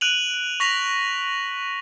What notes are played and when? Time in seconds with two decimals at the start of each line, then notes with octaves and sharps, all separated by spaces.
0.01 F#6 D7 D#7 F7 F#7
0.60 C#6 A#6 B6 F7 F#7